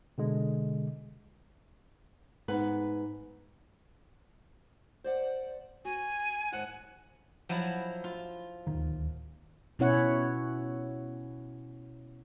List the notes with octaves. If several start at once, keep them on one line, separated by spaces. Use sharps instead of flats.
B2 D3 G#3
G#2 B3 B4
C5 D5 F#5
F#4 G#5
D#2 G#2 F#5 A5
F3 F#3 E4
F4
D1 D#2 D#3
B2 C#4 E4 C#5 F#5